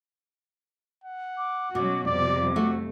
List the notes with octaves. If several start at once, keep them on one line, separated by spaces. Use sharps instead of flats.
F#5
D6
B2 F#3 C#4 F#4 D6
F2 C3 G3 D5 D6
A3 F#4